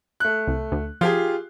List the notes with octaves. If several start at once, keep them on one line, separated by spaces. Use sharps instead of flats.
A3 F#6
C2
D2
F3 F4 G4 G#4